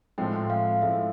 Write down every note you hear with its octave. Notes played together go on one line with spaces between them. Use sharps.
A2 F3 G#3 C4 E4 G5
F5
A2 F3 G#3 C4 E4 E5